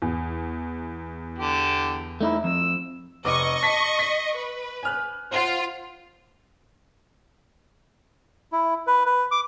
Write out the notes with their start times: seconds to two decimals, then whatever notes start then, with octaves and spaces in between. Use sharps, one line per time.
0.02 E2
1.38 D3 G4
2.21 A3 D#4 E4
2.44 F2 E6
3.25 F1 B4 D#5 C#6 D6
3.63 A5 B6
3.99 B6
4.36 B4
4.83 G#5 F6 F#6
5.31 F4 C5 F#5
8.52 E4
8.87 B4
9.06 B4
9.31 D6